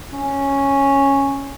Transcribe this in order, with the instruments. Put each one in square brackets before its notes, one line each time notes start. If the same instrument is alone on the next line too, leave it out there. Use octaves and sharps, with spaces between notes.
[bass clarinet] C#4